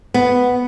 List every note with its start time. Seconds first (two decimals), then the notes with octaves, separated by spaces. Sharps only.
0.14 B3